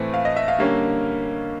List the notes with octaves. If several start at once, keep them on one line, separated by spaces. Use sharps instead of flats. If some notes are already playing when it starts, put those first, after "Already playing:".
Already playing: A2 E3 A3 C4
F5
D#5
E5
F5
D3 G3 A#3 C#4